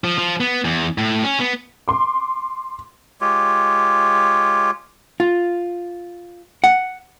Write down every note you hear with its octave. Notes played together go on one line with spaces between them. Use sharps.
F3
F3
B3
E2
A2
C#4
B3
C6 D6
G#3 F4 G4 C#5
F4
F#5